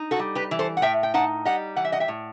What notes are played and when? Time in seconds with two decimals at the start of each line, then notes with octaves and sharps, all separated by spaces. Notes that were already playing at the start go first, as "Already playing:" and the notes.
Already playing: D#4
0.11 F#4 A4
0.19 G3
0.35 G4 B4
0.51 E3
0.59 A4 C5
0.77 F#5
0.82 A2 E5 G5
1.03 G5
1.14 D#4 F#5 A5
1.45 G3 D#5 F#5
1.77 E3 F#5
1.85 E5
1.92 D#5 F#5
2.00 E5 G5
2.08 A2